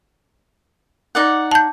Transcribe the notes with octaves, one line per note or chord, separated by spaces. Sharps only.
D#4 D5 F#5
A5 G6